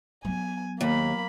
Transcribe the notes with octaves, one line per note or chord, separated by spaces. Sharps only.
F#3 B3 G#5
D#2 A#3 B5